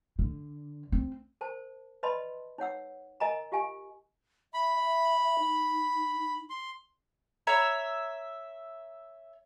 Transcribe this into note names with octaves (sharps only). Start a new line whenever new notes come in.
D3
C4
A#4 C5 A5
B4 D5 D#5 A5 B5 C6
D#4 C#5 F#5 E6
A#4 D#5 G#5 A#5
F4 G4 F5 G#5
E5 B5
E5
D#4
C6
C#5 E5 A#5